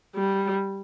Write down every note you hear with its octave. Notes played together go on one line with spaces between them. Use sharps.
G3